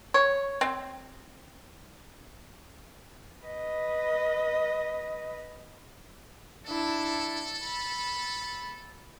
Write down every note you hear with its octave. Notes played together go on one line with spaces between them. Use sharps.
C#5
C4
B4 D#5
D4 E4 A4
B5